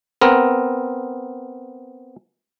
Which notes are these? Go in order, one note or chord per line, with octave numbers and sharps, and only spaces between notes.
B3 C4 A#4